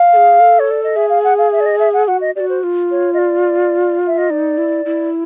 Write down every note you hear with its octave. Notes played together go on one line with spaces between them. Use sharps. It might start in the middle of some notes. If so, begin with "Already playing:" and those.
Already playing: F5
A4
G#4
A4
C#5
D5
D#5
G#4 E5
F5
F#5
F5
E5
D5
D#5
E5
F#5
F#4 F#5
D#5
F#4 G4 D5
C5
F4
C#5
D#5
D5
E5
D#5
D#4 D5
E4
E4